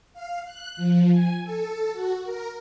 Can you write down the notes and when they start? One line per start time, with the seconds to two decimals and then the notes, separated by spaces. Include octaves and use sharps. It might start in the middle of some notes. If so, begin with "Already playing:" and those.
0.13 F5
0.45 F#6
0.77 F3
1.11 G#5
1.43 A4
1.93 F#4
2.24 A#4